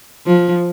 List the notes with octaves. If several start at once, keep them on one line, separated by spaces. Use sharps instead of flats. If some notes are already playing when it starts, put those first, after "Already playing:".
F3